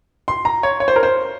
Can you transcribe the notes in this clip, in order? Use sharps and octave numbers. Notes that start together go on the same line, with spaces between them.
C6
A#5
C#5
C#5
C5
A#4
C5